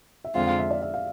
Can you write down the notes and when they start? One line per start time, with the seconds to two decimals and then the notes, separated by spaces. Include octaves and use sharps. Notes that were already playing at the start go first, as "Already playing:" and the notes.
0.24 E5
0.34 F2 D3 G#3 C4 F4 F5
0.46 F5
0.59 E5
0.71 D5
0.82 E5
0.94 F5